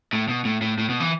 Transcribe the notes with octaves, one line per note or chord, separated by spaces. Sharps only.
A2
B2
A2
A2
A2
B2
E3